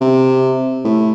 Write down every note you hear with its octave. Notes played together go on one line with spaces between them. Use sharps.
C3
A2